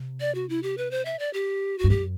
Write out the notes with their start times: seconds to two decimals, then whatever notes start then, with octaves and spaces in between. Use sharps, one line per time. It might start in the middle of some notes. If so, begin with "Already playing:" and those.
Already playing: C3
0.20 D5
0.35 F#4
0.49 E4
0.63 G4
0.78 B4
0.91 C5
1.05 E5
1.19 D5
1.34 G4
1.78 F#4
1.84 G2
1.90 F#2 G4